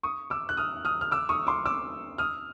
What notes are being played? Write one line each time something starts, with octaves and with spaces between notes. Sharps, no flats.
C#6 D#6
D6 E6
F#6
D#6 F6
D#6 F6
F6
D6 E6
C#6 D#6
C6 D6
D6 E6
D#6 F6